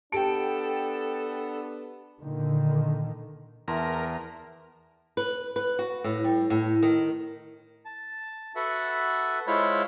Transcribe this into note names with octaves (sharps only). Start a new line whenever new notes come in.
B3 D4 G4 A4 G5 A5 D7
A#2 D3 D#3
E2 A#4 E5 A5 C6
B4
B4
F#4
A2
G3
A2
D#3
A5
F#4 A4 B4 E5 F#5
G#3 E4 F4 C5 C#5 B5